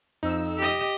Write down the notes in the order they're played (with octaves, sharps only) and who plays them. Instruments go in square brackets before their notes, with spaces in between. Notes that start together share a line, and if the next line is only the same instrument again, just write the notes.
[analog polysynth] F2 E6 [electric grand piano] D#4
[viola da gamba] G4 D#5